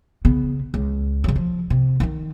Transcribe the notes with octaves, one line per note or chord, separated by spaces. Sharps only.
C#3 B3
C#2
C#3 F#3
F3
C3
D#3 D#4